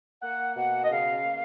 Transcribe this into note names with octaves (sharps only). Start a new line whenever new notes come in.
A#3 F#5
B2 F#5
D#5
C#3 F5
A#3